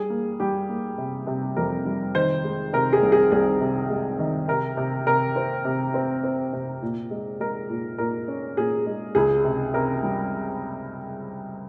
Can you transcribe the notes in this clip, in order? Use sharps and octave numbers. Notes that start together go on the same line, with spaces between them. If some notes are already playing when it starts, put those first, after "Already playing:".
Already playing: G3 G#4
A#3
G3 G4
A#3
C3
C3
F2 A#4
G3
D#3 C5
G#3
C3 A#4
G#4
C2
G#4
C2 G#4
C3
G#3
D#3
C3 A#4
C3
C3 A#4
C4
C3
C4
C4
C3
A#2
G#3
G#3 A#4
A#2
A#2 A#4
C#4
A#2 G#4
G#3
C#2 G#4
C3
C3 A#4
G3